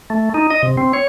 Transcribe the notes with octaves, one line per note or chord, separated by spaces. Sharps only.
A3
D#4
D#5
C3
C4
C#5